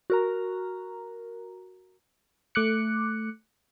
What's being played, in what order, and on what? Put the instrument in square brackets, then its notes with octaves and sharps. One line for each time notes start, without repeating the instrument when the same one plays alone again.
[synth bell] F#4 A#4 A#5
[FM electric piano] A3 D6 F#6 C#7